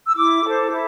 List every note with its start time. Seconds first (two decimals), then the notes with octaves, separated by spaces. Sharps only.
0.06 E6
0.16 E4 D6
0.44 A4 C5
0.72 E4